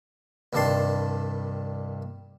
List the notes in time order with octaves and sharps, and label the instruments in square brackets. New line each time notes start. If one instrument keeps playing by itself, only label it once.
[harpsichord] C2 G2 D#3 D4 A5 C6